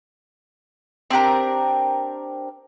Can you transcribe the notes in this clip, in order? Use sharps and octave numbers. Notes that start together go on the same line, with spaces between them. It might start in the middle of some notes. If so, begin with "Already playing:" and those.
C4 D4 G4 A#4